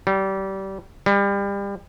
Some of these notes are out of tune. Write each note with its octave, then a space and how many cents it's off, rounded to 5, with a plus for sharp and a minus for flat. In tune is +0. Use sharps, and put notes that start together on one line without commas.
G3 -25
G3 +30